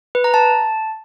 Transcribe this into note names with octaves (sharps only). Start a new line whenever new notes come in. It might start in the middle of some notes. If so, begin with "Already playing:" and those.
B4
A#5
A5